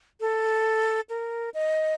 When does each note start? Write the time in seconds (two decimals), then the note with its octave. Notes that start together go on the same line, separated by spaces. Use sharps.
0.20 A4
1.09 A#4
1.54 D#5